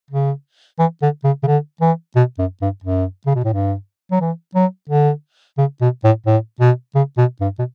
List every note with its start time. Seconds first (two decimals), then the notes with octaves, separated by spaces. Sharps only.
0.10 C#3
0.79 E3
1.02 D3
1.24 C#3
1.43 C#3
1.47 D3
1.81 E3
2.16 B2
2.38 F#2
2.62 G2
2.84 F#2
3.26 C#3
3.35 B2
3.44 A2
3.53 G2
4.11 F#3
4.21 E3
4.55 F#3
4.89 D3
5.58 C#3
5.81 B2
6.04 A2
6.26 A2
6.60 B2
6.95 C#3
7.18 B2
7.41 G2
7.59 B2